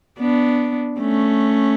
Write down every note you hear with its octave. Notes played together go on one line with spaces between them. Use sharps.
B3 D4
A3 C#4